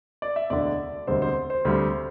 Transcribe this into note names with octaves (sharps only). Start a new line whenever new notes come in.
D5
E5
E1 D2 D3 D5
E1 D2 D3 G3 C4 C5
C5
C5
D2 D3 G3 C4